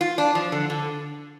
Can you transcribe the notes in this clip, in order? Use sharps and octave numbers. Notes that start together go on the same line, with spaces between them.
F4
D4
F3
D3
D3